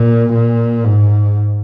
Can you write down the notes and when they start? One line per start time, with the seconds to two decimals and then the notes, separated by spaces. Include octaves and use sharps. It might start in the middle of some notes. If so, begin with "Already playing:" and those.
Already playing: A#2
0.34 A#2
0.84 G#2